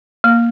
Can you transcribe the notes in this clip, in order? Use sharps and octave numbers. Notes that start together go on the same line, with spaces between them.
A#3